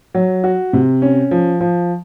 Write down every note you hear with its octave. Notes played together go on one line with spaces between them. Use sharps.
F#3
F#4
C3
C#4
F3
F3